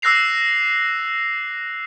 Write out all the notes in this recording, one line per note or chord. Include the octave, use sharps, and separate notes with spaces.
D6 E6 F#6 A#6 C7 F7